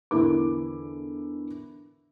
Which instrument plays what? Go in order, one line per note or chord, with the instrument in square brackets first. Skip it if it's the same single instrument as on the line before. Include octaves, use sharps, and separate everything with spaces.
[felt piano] E2 D3 E4 A#4 D6